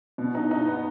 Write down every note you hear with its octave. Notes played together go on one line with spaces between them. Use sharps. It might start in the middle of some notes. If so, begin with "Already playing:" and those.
B2
D#4
D#4
B3